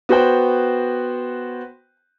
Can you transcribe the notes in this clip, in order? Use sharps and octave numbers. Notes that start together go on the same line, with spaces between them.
B3 F#4 C5 G5